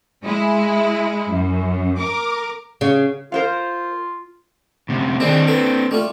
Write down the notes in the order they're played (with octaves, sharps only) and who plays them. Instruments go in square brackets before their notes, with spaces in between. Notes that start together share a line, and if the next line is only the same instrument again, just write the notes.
[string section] G#3 E4
F#2
A#4 D6
[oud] C#3
[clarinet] F4 [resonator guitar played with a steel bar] A#4 C5 F5
[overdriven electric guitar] D2 C3
[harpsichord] D#3 G3 G#4 [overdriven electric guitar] C4 D4
[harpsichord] A4 B4
G3 A3 F4